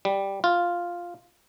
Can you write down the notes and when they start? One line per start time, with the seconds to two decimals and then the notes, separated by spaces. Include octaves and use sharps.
0.05 G3
0.44 F4